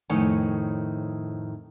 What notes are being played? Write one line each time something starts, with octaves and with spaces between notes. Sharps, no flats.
F2 A2 D#3 C#5 G#5